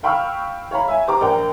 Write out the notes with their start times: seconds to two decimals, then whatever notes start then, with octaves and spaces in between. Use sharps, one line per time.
0.03 F5 G5 B5 C#6 E6 F6
0.71 C#5 F5 A#5 B5
0.88 E5 G#5
1.07 G4 C5 A#5 D6
1.21 A#1 A#4 G5